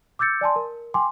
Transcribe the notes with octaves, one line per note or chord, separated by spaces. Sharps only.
D6 E6 G6 A6 C#7
D5 G#5 A5 C6
A#4
G5 G#5 C6 D6